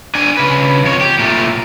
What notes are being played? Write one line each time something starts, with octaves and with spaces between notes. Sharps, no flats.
D4 G#5
C#3 B4
F2 C#5
G4
A#2 A3